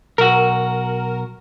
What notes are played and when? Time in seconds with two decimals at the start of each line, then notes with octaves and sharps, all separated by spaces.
0.18 B1 F#4 A#4